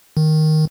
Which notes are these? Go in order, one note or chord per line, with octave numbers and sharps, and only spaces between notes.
D#3